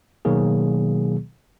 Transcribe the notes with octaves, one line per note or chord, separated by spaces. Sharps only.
B2 D#3 F#3 A#3 G#4